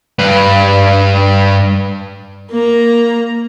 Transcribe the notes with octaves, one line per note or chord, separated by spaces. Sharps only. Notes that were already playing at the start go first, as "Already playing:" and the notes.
G2 B4
A#3 A#5